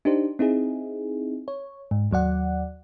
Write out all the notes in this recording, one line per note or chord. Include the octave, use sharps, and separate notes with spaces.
D4 D#4 G4 C5
C4 D#4 E4 G#4
C#5
G#2
D#2 F#3 D5 F#5